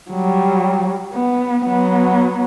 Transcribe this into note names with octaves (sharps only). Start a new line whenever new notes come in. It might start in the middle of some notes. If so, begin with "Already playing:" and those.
F#3 G3
B3
F#3 B3